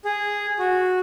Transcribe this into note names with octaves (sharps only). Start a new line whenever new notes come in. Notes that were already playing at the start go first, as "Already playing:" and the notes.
G#4
F#4